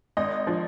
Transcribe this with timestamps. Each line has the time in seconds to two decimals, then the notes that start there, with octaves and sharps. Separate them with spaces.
0.17 G#1 D#5
0.47 F3